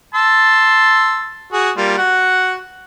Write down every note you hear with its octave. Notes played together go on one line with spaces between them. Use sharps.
A5 C6 E6
F#4 G#4
G3 A#3 F4
F#4 F#5